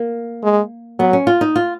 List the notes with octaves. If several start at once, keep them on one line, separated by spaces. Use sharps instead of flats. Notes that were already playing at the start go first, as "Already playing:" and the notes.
Already playing: A#3
G#3
F#3 B3
C#4
F4
D#4
F4